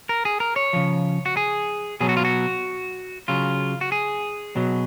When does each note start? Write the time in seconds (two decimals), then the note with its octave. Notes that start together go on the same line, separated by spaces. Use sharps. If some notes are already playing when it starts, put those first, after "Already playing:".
0.09 A#4
0.25 G#4
0.40 A#4
0.56 C#5
0.73 C#3 F3
1.26 F#4
1.37 G#4
2.01 B2 F#3 G#4
2.09 F#4
2.17 F4
2.25 F#4
3.28 C#3 F#3 F4
3.81 F#4
3.92 G#4
4.56 B2 F#3